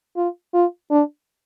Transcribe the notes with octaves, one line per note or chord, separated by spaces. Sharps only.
F4
F4
D4